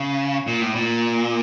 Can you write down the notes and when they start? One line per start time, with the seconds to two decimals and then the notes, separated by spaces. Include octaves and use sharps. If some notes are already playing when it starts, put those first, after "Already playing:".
Already playing: C#3
0.47 A#2
0.61 A2
0.75 A#2